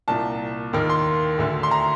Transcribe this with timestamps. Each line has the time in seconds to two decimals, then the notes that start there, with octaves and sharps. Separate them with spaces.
0.08 C2 A#2 A5
0.73 D#2 D#3
0.90 C6
1.38 D2 D3
1.63 C6
1.71 A#5